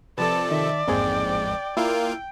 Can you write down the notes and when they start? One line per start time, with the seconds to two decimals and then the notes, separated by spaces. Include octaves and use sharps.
0.18 C3 F3 A4 B4 D5 A5
0.51 D#3 E5
0.88 A1 F2 G#2 A#3 C4 G#4 G5
1.77 A#3 E4 F4 A#4 G5 E6